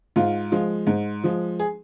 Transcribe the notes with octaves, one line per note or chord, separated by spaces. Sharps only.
G#2 F4
F3 G#3
G#2
F3 G#3
G#4